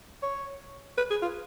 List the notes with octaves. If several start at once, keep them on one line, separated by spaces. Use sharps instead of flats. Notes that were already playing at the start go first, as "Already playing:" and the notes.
C#5
B4
G#4
F4